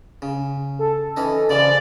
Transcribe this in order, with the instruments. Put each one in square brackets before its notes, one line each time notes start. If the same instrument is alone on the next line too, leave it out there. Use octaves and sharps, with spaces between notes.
[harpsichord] C#3
[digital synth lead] A4
[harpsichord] E3 C#4 D#4
[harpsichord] C#3 E3 F3 [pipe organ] D5